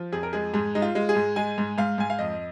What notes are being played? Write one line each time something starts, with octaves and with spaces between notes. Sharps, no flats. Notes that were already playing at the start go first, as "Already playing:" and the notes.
Already playing: F3
F2 G#4
A#4
G#3 G#4
G#2 G#4
G#3 D#4
F4
G#3
G#4
G#2
G#3 G#5
G#2
G#2 F5
G#2 G#5
F5
F2 D#5